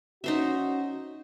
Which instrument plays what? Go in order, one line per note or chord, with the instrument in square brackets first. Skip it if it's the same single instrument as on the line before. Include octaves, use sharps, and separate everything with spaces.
[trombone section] C#4 F#4 [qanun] D#4 C5 E5